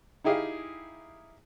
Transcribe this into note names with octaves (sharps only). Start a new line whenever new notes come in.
D#4 E4 G4 G#4 D#5 F5